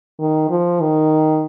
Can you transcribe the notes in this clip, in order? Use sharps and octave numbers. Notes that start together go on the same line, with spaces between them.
D#3
F3
D#3